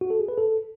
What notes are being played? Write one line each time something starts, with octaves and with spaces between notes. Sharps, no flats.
F#4
A4
G#4
B4
A4